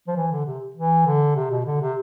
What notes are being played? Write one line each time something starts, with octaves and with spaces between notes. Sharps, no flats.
F3
E3
D3
C3
E3
D3
C3
B2
D3
C3